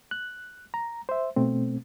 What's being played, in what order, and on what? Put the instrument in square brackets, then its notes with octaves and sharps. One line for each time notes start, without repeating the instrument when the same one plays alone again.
[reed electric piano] F#6
A#5
C5 E5
B2 A3 C4